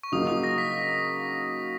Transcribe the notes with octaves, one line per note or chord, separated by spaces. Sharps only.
C#6
C#3 F#3 A#3 D#4 D#6
D#6
A#6
B6